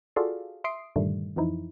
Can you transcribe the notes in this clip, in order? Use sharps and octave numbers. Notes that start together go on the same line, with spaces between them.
F4 F#4 G#4 A4 D5 F5
E5 C6 D#6 C7 D7
G2 A#2 D3 D#3 G3 A3
F2 E3 F3 D#4 E4